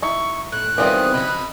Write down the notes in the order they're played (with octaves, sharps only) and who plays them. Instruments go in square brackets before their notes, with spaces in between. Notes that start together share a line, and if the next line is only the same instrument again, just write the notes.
[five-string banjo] D#4 E4 [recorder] C#6
[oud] A2 [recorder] F#6
[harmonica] D#3 B3 D#6 [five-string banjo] E3 G3 F4 [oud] C4 A#4
[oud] C#3 F3 [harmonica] D#5 B5